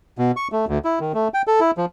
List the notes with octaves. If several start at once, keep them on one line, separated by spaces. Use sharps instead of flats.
B2
C#6
A3
D2
E4
D#3
A3
G5
A4
E4
F3